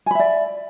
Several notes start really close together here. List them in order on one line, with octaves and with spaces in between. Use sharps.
G#5 B5 E5 D5